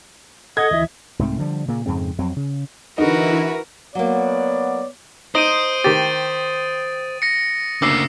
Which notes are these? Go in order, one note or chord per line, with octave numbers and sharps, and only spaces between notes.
A4 D#5 F#5 G#6
D2 E3 E4 E5
C2 G#2 A3 C4
D3 F3 G3
A#2 C#3 A#3
F2 G#2 C#3 C4
F2 F#3 C4
C#3
D3 E3 D#4 E4 F#4 A#4 B4
F#3 A#3 B3 C#5 D5
D#4 C5 D#6 D7 D#7
D#3 G4 A6
A#6 C#7
D2 C#3 A#3 D6 E6 C7